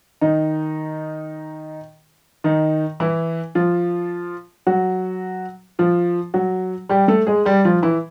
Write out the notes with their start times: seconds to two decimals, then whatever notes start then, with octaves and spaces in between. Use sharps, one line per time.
0.21 D#3 D#4
2.44 D#3 D#4
3.00 E3 E4
3.55 F3 F4
4.67 F#3 F#4
5.79 F3 F4
6.34 F#3 F#4
6.89 G3 G4
7.08 A3 A4
7.27 G#3 G#4
7.45 G3 G4
7.65 F3 F4
7.82 E3 E4